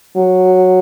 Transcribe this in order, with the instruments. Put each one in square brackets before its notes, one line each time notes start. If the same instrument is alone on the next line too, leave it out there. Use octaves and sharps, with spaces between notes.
[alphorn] F#3